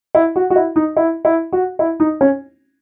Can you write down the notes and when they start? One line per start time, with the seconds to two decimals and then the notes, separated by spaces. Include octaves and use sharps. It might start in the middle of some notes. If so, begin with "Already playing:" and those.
0.15 E4
0.36 F#4
0.50 F#4
0.56 E4
0.76 D#4
0.97 E4
1.25 E4
1.53 F#4
1.79 E4
2.00 D#4
2.21 C#4